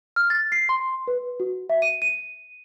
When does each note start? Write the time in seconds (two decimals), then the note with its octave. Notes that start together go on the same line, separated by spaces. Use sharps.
0.16 F6
0.30 A6
0.52 C7
0.69 C6
1.08 B4
1.40 F#4
1.69 E5
1.82 D#7
2.02 D#7